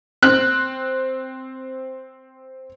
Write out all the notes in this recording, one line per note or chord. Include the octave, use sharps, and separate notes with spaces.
C4 F#6